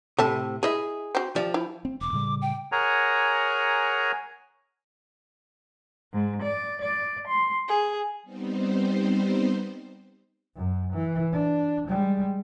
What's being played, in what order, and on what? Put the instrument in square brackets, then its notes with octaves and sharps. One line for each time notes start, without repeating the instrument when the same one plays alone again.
[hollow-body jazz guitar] A2 C3 [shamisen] A4 E5 A5
[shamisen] E4 D#5 E5 [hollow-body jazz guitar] G#4
[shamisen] C4 F#4
[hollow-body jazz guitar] F3 [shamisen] G4 D5 E5
[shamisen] E4
[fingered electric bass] C4
[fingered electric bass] E1 [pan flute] D6
[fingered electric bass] A2 C#3 G3
[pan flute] G5
[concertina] G#4 A#4 C#5 F#5 G#5 A#5
[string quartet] G#2
D5
D5
C6
G#4
[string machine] G3 B3 C4 D#4 C5
[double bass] F#2
E3
D4
G3 G#3